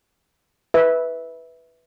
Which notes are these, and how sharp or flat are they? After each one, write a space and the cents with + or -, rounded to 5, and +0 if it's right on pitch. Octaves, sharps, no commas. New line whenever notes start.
B4 +0 E5 -15